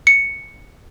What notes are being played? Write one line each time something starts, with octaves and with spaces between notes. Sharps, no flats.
C#7